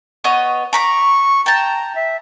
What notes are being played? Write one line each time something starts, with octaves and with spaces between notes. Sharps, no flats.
B3 C#5 D#5
A#5 B5 C#6 D6
G5 A5 A#5
E5